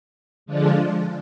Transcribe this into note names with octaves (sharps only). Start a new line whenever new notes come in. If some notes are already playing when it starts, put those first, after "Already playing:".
D3 F3 G#3 D4 F4